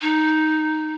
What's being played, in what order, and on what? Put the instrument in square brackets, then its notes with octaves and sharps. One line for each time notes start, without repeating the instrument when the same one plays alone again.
[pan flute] D#4